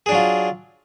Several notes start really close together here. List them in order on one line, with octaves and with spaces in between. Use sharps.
G#4 D4 F#3 F4